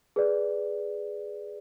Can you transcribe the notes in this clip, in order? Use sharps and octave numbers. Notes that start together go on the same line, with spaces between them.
G#4 B4 D5